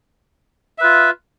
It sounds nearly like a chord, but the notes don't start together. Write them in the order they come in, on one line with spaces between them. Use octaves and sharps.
E5 B4 F4